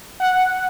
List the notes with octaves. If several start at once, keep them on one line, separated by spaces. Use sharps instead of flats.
F#5